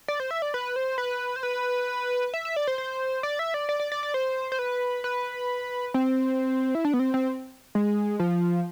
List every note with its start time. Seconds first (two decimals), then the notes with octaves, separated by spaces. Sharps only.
0.08 D5
0.20 C5
0.31 E5
0.42 D5
0.54 B4
0.76 C5
0.98 B4
1.36 C5
1.43 B4
2.34 E5
2.45 E5
2.56 D5
2.67 C5
2.78 C5
3.23 D5
3.39 E5
3.54 D5
3.69 D5
3.80 D5
3.92 D5
4.03 D5
4.14 C5
4.52 C5
4.59 B4
5.04 B4
5.94 C4
6.75 E4
6.85 D4
6.94 B3
6.99 C4
7.14 C4
7.75 G#3
8.20 F3